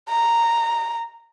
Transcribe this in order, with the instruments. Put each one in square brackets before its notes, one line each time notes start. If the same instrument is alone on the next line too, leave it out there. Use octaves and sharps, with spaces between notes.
[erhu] A#5